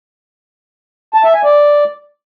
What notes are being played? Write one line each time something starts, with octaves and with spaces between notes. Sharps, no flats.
A5
E5
G#5
D5